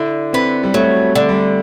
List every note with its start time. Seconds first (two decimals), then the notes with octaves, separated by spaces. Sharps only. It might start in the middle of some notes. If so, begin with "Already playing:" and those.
Already playing: D3 E4
0.33 B3 C4
0.63 G3
0.74 F#3 A3
1.15 D3
1.29 G3